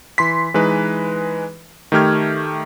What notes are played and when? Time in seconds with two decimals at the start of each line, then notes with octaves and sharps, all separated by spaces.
0.18 E3 C6 B6
0.54 E3 G#3 D#4 B4
1.92 D#3 A3 G4 F6 G#6